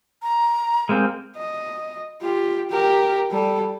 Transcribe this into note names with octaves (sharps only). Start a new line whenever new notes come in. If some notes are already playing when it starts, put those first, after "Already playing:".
A#5
G#3 A#3 C4
D#5
F4 G4
G4 A#4
G3 A4